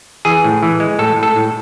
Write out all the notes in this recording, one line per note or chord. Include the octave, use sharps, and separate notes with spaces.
E3 G#4
A2
E3
G#3
A2 A4
A2
A4
A2